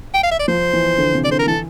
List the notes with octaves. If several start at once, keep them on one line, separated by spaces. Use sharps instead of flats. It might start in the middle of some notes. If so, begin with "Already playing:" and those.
G5
F5
E5
D5
F3 C5
E3
D3
C3
D5
D3 C5
A#4
E3 A4